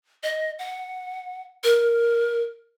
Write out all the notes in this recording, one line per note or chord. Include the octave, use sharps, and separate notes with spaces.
D#5
F#5
A#4